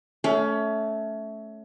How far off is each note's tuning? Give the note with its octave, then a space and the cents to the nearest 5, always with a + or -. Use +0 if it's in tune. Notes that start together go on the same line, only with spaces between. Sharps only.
A3 -10 C#4 +20